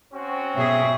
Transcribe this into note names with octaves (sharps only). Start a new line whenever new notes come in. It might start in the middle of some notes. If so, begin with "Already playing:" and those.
C4 C#4 F#4
B2 G#4 C#5 E5 C#6